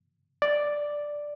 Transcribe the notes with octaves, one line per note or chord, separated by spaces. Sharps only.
D5